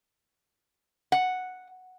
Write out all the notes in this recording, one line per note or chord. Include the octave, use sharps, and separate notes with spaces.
F#5